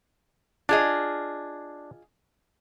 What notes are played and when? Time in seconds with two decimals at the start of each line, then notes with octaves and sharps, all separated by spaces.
0.69 D4 F4 G#4 D#5